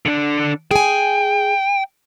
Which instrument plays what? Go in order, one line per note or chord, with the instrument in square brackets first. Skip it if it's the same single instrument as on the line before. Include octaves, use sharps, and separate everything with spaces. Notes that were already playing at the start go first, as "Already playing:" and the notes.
[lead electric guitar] D3 D4
[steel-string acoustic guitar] G#4 G#5 [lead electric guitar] G5